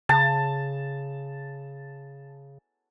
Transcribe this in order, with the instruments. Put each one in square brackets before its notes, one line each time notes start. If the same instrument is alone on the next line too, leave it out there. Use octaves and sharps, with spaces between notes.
[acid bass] C#3 [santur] A5